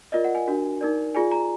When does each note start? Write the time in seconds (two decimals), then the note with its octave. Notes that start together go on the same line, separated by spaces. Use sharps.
0.12 F4 A#4 D5 D#5
0.24 F#5
0.35 G#5
0.47 D4 F#4 A#4
0.81 D#4 A#4 D5
1.15 F4 G#4 D5 G#5
1.32 A#5